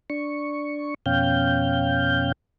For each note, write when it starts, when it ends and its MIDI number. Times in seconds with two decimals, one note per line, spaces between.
0.10 0.94 62
0.10 0.94 85
1.06 2.32 41
1.06 2.32 47
1.06 2.32 61
1.06 2.32 77
1.06 2.32 79
1.06 2.32 91